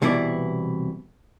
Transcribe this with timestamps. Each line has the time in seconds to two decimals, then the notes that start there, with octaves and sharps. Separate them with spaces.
0.02 C2 B2 E3 E4 G#4 D5